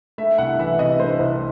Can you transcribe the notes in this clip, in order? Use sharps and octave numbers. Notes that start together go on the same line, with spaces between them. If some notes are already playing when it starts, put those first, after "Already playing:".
A3 E5
C2 F#5
E3 E5
C3 D#5
A3 C5
C2